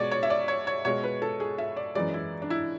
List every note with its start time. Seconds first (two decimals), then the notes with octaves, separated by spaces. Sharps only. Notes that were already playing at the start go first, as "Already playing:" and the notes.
Already playing: B2 G#3 C#5 D5
0.11 C#5
0.23 E5
0.30 D5
0.48 C#5
0.67 C#5
0.85 B2 G#3 C#5
1.03 B4
1.22 A4
1.40 G#4
1.58 E5
1.77 D5
1.95 F#2 E3 G#3 D5
2.14 E4
2.42 D4
2.50 E4